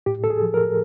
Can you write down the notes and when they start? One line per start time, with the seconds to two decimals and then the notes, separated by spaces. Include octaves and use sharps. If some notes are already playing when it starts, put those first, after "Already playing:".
0.06 A2 G4
0.24 A4
0.30 G#4
0.42 F3
0.54 A#4